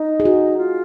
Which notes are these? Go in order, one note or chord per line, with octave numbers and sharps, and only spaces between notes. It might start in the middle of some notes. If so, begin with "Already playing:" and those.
Already playing: D#4
G#4
F#4
F4